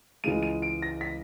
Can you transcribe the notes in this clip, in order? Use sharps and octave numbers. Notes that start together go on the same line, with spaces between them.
C#2 C#3 E3 G#3 D#7
D#7
D7
A#6
B6